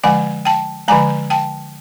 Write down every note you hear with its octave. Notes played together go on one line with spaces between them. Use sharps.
D3 F3 G#3 F#5 G#5
G5 A5
D3 F3 G#3 G#5 A#5
G5 A5